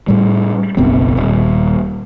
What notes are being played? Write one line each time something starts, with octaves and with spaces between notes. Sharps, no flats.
A2 G3
F#1 B1 B3 C4
D#1